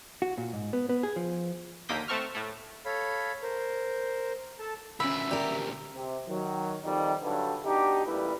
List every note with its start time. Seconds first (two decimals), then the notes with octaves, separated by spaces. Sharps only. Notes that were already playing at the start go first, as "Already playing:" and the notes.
0.22 F#4
0.38 A#2
0.53 G#2
0.73 B3
0.89 B3
1.03 G#4
1.16 F3
1.89 D#2 D3 A#3 D#6 G6 B6
2.08 A3 C4 A5 C#6 F6
2.35 A2 A3
2.86 A4 C#5 F5 B5
3.42 A#4 C5
4.59 A4 A5
5.00 D2 A#2 C#4 E5 B5
5.31 G4 A#4 D5
5.94 C3
6.26 D#3 F#3
6.83 F2 D#3 G3 D#4
7.22 G2 D3 F#3 A4 B4
7.64 B2 D4 D#4 G4
8.06 A1 A#2 G3 E4 B4